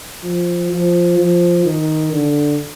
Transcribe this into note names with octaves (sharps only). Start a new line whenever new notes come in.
F3
F3
F3
D#3
D3